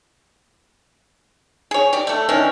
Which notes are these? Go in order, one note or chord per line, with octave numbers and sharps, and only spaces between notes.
G#4 C#5
G4 D5
A3 A4
D#3 E3 C#4 D4